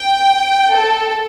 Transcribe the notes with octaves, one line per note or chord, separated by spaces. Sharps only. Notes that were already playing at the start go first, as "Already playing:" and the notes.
Already playing: G5
A4